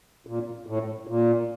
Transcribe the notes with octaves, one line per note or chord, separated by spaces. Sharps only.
A#2
A2
A#2